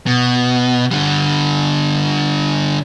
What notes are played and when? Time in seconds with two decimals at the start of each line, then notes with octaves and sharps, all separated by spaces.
0.07 B2
0.92 D3 G3